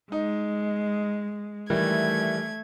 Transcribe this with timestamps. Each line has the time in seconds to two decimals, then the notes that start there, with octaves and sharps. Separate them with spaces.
0.12 G#3 D#4
1.70 D#3 E3 G3 A3 G#6